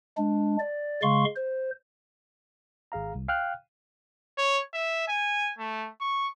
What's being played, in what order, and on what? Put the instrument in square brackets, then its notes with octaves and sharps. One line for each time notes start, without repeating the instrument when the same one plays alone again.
[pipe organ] G#3 D4
D5
C#3 G#3 F5 C6 C#6
C5
[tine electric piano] G#1 G#4 F5 A#5
C2
F5 G5 F6 F#6
[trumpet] C#5
E5
G#5
A3
C#6